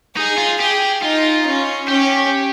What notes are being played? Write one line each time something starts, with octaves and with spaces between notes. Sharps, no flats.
D#4 G#4
F4
G4 G#4
D#4 F4
C#4
C#4 G4